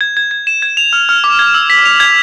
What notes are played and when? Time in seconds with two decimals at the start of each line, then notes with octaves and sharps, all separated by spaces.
0.01 G#6
0.17 G#6
0.31 G#6
0.47 E7
0.62 G#6
0.77 F7
0.93 F6
1.09 F6
1.24 D6
1.39 G#6
1.54 E6
1.70 B6
1.85 F7
2.00 G#6